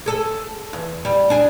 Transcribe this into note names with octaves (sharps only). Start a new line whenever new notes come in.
G#4 A4
E2
G3
D4 G#4